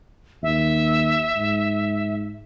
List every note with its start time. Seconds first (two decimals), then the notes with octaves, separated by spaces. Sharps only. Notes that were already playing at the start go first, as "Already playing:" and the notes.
0.43 D#2 E5
1.36 G#2